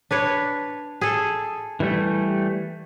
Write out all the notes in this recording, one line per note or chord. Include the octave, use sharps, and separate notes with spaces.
D4 B4 C#5
G#4 A4
E3 G3 A3